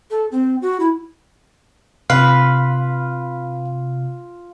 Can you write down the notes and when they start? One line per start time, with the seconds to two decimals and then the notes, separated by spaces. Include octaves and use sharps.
0.11 A4
0.32 C4
0.62 F#4
0.80 E4
2.10 C3 F4 B4 F5